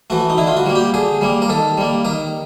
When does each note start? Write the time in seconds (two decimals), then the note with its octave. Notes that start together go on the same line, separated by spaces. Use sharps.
0.10 E3 A3 F#4
0.30 D#4
0.38 D3 E4
0.47 F4
0.57 F#4
0.66 G3 A#3
0.75 G4
0.94 D3 G#4
1.21 G3 A#3
1.42 A#4
1.49 D#3 A4
1.77 G3 A#3
2.05 D#3 A#4